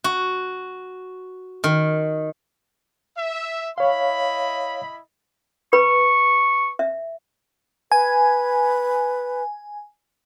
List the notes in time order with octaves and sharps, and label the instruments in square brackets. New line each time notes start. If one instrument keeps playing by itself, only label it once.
[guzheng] F#4
D#3
[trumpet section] E5
[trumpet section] E4 D#5 B5 [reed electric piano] C#5 F5
[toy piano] B4 B5 [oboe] C#6
[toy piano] E5
[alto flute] B4 [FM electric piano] G#5